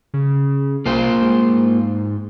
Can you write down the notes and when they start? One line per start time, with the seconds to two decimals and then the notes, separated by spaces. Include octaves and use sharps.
0.14 C#3
0.86 C2 A#3 F4 C5
1.22 G#2